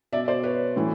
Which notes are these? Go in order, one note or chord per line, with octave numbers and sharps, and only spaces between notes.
B2 D5 E5
C5 D5
B4 C#5
A2 E3